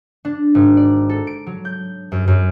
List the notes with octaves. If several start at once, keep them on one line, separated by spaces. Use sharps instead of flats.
D4
G#1
D5
A4
D7
F#3
G6
F#2
F#2